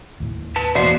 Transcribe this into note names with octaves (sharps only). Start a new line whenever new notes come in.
D#2 A2
B4 A5
E1 E3 A#3 B3 F#4 C5 D5